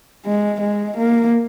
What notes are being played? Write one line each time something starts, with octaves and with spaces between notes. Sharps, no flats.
G#3
G#3
A#3